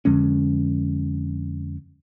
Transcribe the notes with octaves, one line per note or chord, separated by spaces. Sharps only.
F2 D3 G#3 C#4